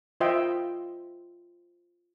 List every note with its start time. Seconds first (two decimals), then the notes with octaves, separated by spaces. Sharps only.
0.20 F4 C5 D#5 E5 G5